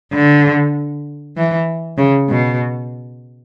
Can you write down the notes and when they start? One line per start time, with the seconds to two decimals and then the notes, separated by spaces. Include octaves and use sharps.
0.13 D3
1.37 E3
1.98 C#3
2.29 B2